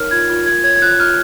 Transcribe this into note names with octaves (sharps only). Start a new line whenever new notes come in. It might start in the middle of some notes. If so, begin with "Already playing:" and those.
Already playing: D#4 A#4 C#5 F6
F4 G#6
F4
A#4 G#6
C#5 G#6
G#6
F4 F#6
F4 F6